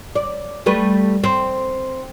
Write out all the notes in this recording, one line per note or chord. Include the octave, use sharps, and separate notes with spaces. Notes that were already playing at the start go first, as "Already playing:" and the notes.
D5
G3 A3 B4
C4